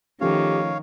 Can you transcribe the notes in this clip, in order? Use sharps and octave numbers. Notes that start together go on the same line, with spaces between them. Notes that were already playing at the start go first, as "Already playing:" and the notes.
D#3 F3 A3 C#4 G4 C#5 F5